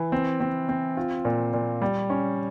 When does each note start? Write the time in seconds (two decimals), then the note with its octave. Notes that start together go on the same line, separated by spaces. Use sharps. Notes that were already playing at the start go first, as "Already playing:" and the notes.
Already playing: E3
0.12 C4
0.40 C4
0.69 C4
0.97 F4
1.25 A#2
1.53 A#2
1.82 G3
2.10 C#4